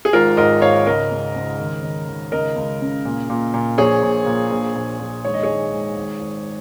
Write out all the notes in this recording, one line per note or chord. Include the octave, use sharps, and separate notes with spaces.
G#4
G#1 F4 A#4
G#2 A#4 D#5
G#2 C#5 F5
C#2 A#4 D#5
C#2
C#2
D#3
D#3
D#3
C#2 A#4 D#5
C#2
C#3
A#2
A#2
A#2
A#1 G#4 C#5
A#1
A#2
A#1
A#1
A#1
G#1 C#5
D#5
G#4 C#5
G#1
G#1
G#1
G#1